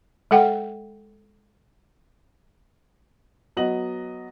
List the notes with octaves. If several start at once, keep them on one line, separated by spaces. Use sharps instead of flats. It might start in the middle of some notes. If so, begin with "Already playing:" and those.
G#3 A4 F#5 G5
F#3 B3 D#5 F#7